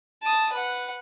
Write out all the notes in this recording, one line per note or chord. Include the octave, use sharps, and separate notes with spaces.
A5 D#6
B4 F#5